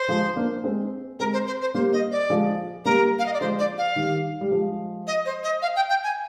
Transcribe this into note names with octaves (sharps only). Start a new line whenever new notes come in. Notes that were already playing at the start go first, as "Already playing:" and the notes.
Already playing: C5
F3 G#3
A#3 D4
G#3 C4
G#3 C4 A#4
C5
C5
C5
G3 A#3 C5
D#5
D5
F3 G#3
G3 A#3 A#4
F5
D#5
D5
F3 G#3 C5
D5
F5
D#3 G3
G3
F3 G#3
D#5
C5
D#5
F5
G5
G5
G#5